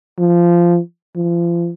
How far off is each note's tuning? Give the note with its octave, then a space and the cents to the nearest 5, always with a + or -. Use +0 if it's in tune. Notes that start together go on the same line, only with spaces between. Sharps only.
F3 -15
F3 -35